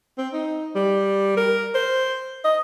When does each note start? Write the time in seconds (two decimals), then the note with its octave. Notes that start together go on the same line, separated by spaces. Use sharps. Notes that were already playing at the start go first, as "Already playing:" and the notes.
0.18 C4
0.33 D#4
0.75 G3
1.37 A#4
1.75 C5
2.44 D#5